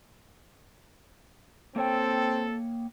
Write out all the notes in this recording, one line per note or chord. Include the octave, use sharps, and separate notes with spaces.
A#3 C4 A4 C#5 G5